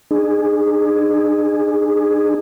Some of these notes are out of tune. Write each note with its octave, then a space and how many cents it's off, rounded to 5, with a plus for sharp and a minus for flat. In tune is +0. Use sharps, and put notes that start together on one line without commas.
D#4 -45 G#4 +0